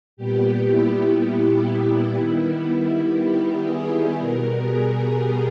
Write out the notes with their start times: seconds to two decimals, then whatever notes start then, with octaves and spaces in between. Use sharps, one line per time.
0.17 A#2 G3 B3 G4
0.67 E4
2.15 D#3 G3 B3 E4
3.15 G4
3.65 G#4
4.15 B2 G3 B3 A#4
4.65 G#4
5.14 G4